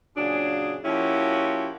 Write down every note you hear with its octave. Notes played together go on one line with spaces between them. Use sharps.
A#2 C#3 F#3 D4 G#4
F3 A#3 C#4 E4 F#4 G4